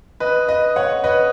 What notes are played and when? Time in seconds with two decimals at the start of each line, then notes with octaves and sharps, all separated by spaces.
0.20 B4 D#5
0.48 B4 D#5
0.76 C#5 F#5
1.04 B4 D#5